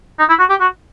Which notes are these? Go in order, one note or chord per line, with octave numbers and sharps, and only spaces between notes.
D#4
E4
F#4
G4
F#4